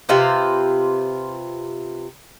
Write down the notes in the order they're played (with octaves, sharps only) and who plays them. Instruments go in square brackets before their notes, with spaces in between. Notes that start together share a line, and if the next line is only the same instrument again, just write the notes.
[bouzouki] C3 F4 B4 C5